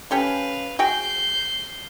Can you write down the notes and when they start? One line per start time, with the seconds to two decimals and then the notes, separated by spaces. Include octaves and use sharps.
0.11 C#4 G4 A4 B4 F5
0.79 F#4 G#4 G5 G6 C7